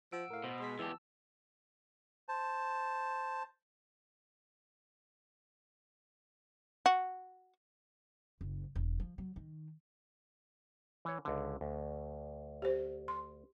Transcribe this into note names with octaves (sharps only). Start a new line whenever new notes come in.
F3 F#5 E6 D7
A2 A#4 F5
B2 C5
G#3 C6 B6
E2 E3 G4 A5 E6
C5 A5
F#4
F#1
E1
F3
F#3
D#3
E3 C#5
C#2 D3
D2
G4 C5
C6